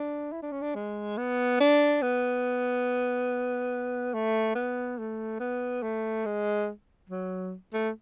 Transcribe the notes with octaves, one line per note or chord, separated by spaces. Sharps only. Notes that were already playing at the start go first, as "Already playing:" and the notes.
Already playing: D4
E4
D4
C#4
D4
G#3
B3
D4
B3
A3
B3
A3
B3
A3
G#3
F#3
A3